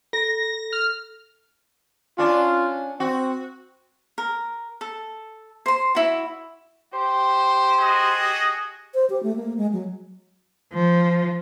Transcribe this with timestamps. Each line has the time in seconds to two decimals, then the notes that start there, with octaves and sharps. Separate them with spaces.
0.13 A4 A#6
0.73 F6
2.18 C#4 D4 F4
3.00 C4 F#4
4.18 A#4
4.81 A4
5.66 C5 C6
5.95 E4 F#4
6.94 G4 C5
7.78 F#4 G#4 D#5
8.94 C5
9.10 G4
9.23 A3
9.36 A#3
9.57 G#3
9.73 F#3
10.73 F3